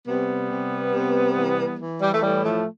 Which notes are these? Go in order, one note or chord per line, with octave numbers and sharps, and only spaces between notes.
C3 G3 B3
C3
C3
E3
E3
G3
A3
A2 G3
F3 A3